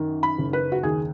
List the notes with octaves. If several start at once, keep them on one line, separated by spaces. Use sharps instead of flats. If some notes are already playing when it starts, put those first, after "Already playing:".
Already playing: F#2 D#3
B5
F#1
B4
F#4
D#2 G#4